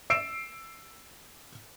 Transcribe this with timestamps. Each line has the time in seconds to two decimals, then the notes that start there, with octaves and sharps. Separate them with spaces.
0.10 E6 C7 D7 E7